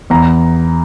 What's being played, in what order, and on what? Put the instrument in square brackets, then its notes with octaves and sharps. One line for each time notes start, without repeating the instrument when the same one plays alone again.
[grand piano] E2 A#5